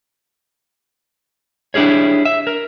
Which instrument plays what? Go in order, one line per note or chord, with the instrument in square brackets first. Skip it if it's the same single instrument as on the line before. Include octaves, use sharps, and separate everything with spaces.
[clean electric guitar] D4 E4 G4 G#4 C#5
E5
A#4